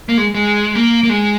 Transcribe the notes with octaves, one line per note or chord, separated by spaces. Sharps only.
A#3
G#3
G#3
A#3
A#3
G#3